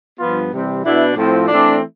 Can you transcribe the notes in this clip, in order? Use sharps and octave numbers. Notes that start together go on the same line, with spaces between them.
G2 F3 B3 F4
C3 E3 G3 C4
B2 B3 D4 E4
A2 F3 C4
E3 A3 C4 D4